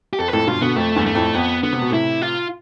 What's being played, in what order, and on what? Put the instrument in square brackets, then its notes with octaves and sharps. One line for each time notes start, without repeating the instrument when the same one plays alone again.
[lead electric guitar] G4
[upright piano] F2 [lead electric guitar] A4
[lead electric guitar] B4
[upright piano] F2 A2 [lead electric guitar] A4
[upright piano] G2 B2 [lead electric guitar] F4
[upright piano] B2 D3 [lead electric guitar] B3
[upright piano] F2 [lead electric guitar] A3
[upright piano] E2 G2
[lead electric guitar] A3
[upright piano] F2 A2
[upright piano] F2 [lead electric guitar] B3
[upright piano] D3 [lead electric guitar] B3
[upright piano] C3
B2
[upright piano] A2 C3 [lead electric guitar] E4
[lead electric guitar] F4